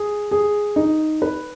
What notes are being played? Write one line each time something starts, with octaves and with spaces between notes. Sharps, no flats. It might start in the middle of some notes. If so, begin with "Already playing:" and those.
Already playing: G#4
G#4
D#4
B4